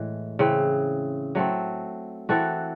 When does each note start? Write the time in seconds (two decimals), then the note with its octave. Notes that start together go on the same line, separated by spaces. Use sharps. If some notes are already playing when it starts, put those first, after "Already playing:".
Already playing: A2 E3 G#3
0.39 C#3 E3 C4
1.35 F#3 A3 C4
2.29 E3 C4 F#4 A4